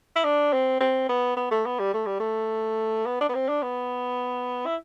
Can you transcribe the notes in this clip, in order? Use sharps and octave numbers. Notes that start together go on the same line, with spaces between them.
E4
D4
C4
C4
B3
B3
A3
B3
G3
A3
G3
A3
B3
D4
B3
C4
D4
B3
E4